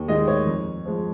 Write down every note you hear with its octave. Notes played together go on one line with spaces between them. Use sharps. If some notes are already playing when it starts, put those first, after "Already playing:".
Already playing: D#2
D#3 G#3 D#5
C#5
F2
F3 G#3